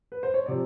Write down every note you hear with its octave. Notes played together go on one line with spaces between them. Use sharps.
B4
C5
C#5
C3 F3 D5